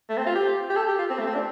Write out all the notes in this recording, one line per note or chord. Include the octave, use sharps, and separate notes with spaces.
A3
C4
F4
G4
G4
A4
G4
F4
C4
A3
C4
D4